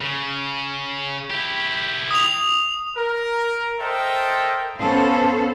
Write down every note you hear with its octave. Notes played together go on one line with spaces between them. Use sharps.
C#3
E4 G4
D#6 F7
A#4
A4 A#4 C5 D#5 E5 G5
B3 C#4 A4 C5 F5